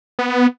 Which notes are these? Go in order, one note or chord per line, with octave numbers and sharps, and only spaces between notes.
B3